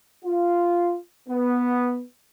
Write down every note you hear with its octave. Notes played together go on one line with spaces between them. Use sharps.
F4
B3